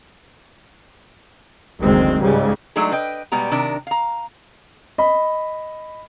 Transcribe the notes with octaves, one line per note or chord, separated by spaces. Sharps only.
F#1 D2 D#3 G#3 C4
C#2 G#2 C#3 G3 G#3
F#3 G#3 A3 D4 D#4 G#4
B4 D#5 G5
B2 G3 G#3 B3 A#5
C3 D#3 D4 A#4
F5 A#5
D#5 B5